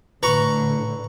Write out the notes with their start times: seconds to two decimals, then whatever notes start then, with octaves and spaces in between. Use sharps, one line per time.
0.23 A2 D3 B4 A#5 C#6